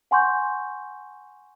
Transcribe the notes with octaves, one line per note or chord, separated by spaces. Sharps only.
F#5 G#5 C6 C#6 G6